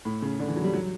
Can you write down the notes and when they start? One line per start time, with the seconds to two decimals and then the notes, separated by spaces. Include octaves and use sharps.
0.05 A2
0.22 C#3
0.40 D3
0.48 E3
0.56 F#3
0.64 G3
0.74 F#3